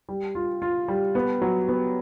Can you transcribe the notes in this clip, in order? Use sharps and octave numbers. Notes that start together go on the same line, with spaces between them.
G3
F4
F4
G3
B3
F#3
B3